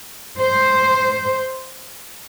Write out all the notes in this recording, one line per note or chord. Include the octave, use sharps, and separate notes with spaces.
C5